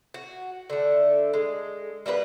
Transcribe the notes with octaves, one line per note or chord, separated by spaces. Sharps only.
F#4
D3 A3
G#3
G3 A#3 D#4 B4